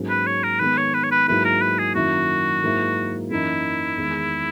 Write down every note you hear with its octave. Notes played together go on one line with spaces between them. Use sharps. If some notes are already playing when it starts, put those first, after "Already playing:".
Already playing: G#2 F#3 A#3 C#4
B4
C#5
A#4
D#3 G#3 B3 B4
C#5
B4
C#5
B4
G#2 F#3 A#3 E4 B4
A#4
B4
G#4
F#2 D#3 F#3 A#3 E4 F#4
G#2 F#3 A#3 E4
F#2 E3 A#3 D#4 E4
E2 D#3 G#3